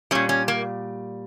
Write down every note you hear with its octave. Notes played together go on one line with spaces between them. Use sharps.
A#2 G3 C#4
C#4
A#3